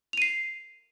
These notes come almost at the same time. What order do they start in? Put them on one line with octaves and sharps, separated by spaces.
F7 D#7 C7